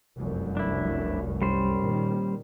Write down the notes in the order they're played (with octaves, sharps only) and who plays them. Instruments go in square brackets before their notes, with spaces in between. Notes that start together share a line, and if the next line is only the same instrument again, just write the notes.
[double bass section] F1 C2 F#2
[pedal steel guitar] D4 E4
G3 C#4 C5
[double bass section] A#2 D#3